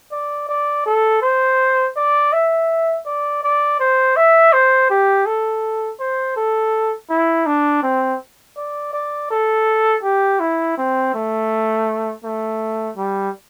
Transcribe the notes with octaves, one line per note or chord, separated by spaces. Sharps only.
D5
D5
A4
C5
D5
E5
D5
D5
C5
E5
C5
G4
A4
C5
A4
E4
D4
C4
D5
D5
A4
G4
E4
C4
A3
A3
G3